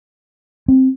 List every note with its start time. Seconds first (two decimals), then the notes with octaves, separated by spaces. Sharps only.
0.68 C4